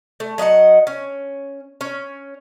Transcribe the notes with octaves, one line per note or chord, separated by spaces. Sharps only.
A3
F#3 D#5 E5 F#5
C#4
C#4